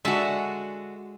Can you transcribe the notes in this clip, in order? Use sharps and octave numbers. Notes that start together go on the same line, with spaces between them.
D3 G#3 F#4 E5 A5